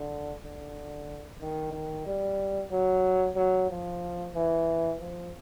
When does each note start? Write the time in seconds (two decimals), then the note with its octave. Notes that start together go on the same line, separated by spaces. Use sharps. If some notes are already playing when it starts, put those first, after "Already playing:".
Already playing: D3
0.43 D3
1.41 D#3
1.73 D#3
2.07 G3
2.71 F#3
3.36 F#3
3.70 F3
4.35 E3
5.00 F3